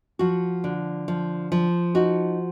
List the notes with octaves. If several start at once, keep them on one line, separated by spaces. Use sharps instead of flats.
F3 F#4
D3
F3
F3
D#4 F#4